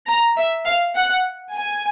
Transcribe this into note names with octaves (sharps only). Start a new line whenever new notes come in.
A#5
E5
F5
F#5
G#5